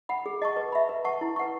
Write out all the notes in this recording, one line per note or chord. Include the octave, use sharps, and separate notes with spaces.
F#5 B5
G#4
D#5 A5 C#6
B4
E5 B5
B4
F#5 A5 C#6
E4
B4 F#5 C#6